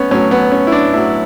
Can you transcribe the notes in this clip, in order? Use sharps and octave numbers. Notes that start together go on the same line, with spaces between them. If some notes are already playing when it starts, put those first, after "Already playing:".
Already playing: A2 B3 C#4
A2 F#3 C#4
B3
C#4
E4
D4
A2 F#3 E4